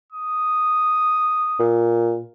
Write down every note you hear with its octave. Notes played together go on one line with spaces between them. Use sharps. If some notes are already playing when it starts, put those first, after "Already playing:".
D#6
A#2